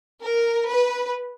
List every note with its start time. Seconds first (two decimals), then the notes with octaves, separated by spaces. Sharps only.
0.22 A#4
0.68 B4